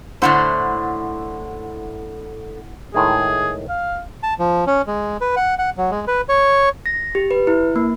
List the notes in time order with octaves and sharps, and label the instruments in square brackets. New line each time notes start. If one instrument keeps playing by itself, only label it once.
[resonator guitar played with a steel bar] A2 D3 C5 [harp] E4 F#5 C6
[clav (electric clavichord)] A2 D#3 G#3 [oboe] G#4
[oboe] F5
[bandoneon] A5
F3
C#4
G#3
B4
F#5
F#5
F#3
G#3
B4
C#5
[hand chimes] A#6
G4
B4
E4
A#3